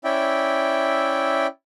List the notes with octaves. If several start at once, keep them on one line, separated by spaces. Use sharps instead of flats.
C#4 E4 D5 E5 G5